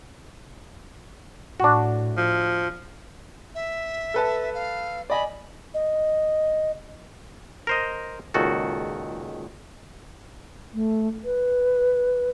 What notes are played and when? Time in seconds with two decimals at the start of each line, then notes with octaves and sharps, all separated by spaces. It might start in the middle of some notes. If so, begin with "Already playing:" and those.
1.60 A2 D4 F#4
2.17 F3
3.55 E5
4.14 A4 B4 A5
4.54 F5
5.10 D5 D#5 G#5 B5
5.74 D#5
7.67 A#4 C5 D#5
8.34 C#2 A#2 D#3 F#4 A4
10.74 A3
11.24 B4